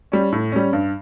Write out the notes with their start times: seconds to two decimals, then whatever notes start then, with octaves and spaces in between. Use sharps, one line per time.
0.12 G3 C#4
0.32 A2
0.52 G3 C#4
0.73 G2